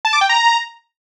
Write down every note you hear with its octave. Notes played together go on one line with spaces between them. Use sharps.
A5
D6
G5
A#5